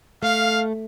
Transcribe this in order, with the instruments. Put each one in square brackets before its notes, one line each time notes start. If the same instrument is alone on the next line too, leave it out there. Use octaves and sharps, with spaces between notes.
[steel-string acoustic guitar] A3 [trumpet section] F5